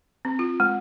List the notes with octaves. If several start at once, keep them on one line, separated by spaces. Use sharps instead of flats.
C4
F4
G#3